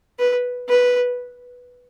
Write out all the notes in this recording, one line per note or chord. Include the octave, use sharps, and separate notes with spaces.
B4
B4